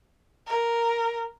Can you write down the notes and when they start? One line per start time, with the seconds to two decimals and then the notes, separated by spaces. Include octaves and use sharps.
0.47 A#4